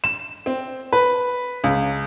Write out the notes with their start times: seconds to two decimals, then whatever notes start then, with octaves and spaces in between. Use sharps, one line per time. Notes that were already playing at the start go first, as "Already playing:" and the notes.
0.04 E7
0.46 C4
0.93 B4
1.64 C#2